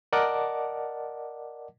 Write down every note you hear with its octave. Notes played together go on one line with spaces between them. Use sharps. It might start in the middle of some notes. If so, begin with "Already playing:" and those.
A#4 D5 D#5 F#5 A5 D6